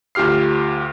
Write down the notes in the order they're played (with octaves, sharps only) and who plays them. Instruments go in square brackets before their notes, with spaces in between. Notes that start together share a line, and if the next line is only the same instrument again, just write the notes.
[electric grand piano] D2 F4 G4 F6 C7